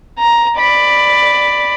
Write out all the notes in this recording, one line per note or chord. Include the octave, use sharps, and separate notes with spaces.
A#5
D5 B5